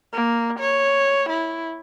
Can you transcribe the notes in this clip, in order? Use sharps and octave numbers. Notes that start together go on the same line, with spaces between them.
A#3
C#5
E4